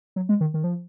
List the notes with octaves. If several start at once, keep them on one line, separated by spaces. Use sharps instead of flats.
F#3
G#3
D#3
D#3
F3